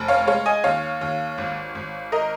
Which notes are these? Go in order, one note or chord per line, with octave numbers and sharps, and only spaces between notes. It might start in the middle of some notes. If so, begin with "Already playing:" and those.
Already playing: F1
C#5 F5
G#3 C#5 F5
D#5 G#5
D#2 C#5 F5
D#2
G#1
G#1
A#4 D#5